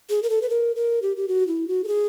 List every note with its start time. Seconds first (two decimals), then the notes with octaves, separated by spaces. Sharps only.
0.10 G#4
0.23 A#4
0.30 A4
0.42 B4
0.50 A#4
0.76 A#4
1.02 G4
1.17 G4
1.28 F#4
1.48 E4
1.68 F#4
1.84 A4
1.88 G#4